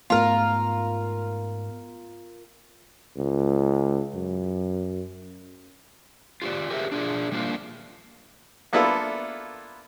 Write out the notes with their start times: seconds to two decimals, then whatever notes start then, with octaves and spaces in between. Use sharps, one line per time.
0.10 G#2 A3 B3 F4 A#4
3.16 C#2
4.15 F#2
6.42 F4 G4 C5 D5
6.70 G4 G#4 A#4 C5 E5
6.92 D4 F4 G#4 D5
7.32 G3 A#3 D4 F4 A#4 C5
8.73 A#3 B3 D4 E4 F4 A4